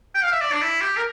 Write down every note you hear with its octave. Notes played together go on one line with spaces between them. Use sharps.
G5
F5
E5
D5
D4
E4
G4
A#4